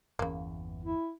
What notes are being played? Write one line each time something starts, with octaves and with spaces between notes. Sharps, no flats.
G1 E2 C#3 E3 A#3
E4